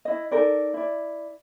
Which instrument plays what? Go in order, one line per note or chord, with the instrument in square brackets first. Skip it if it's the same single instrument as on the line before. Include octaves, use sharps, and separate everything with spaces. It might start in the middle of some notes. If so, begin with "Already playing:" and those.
[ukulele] E4 D#5
D#4 A4 A#4 D5
E4 D5